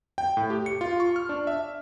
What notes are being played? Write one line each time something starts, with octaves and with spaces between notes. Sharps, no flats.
G5
A2
G4
C#7
F4
C#6
F6
D4
E5